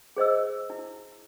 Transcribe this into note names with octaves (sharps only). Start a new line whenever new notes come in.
G#4 C5 D#5 E6
E4